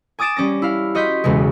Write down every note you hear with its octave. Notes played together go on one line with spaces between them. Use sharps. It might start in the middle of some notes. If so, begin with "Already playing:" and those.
G#5 D6 D#6 A6 D7 E7
G3 C#4 D6 A#6
E4 F5
F#4 D#5 C6 G6 B6
B1 E2 C#3 G#3